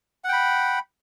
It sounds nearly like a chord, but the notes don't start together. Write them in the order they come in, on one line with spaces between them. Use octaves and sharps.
F#5 G5 B5